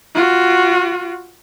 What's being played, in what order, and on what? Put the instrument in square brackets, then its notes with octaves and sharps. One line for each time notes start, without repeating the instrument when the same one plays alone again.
[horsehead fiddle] F4 F#4